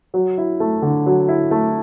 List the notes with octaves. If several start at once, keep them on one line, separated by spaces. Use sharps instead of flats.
F#3
E4
A3
D3
F#3
E4
A3